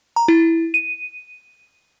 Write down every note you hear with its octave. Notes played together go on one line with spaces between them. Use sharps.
A#5
E4
D#7